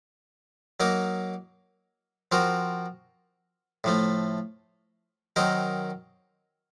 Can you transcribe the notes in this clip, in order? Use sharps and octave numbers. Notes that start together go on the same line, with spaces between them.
F#3 A#3 D#4 A#4
F3 C4 F#4 A#4
A2 F3 A3
D#3 F#3 C4 D#4 A#4